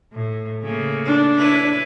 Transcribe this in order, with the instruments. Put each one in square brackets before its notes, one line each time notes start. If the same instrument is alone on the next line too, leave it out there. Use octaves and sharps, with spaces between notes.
[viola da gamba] A2
C#3 A3 A#3
[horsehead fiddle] D4
[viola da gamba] E4 B4 C#5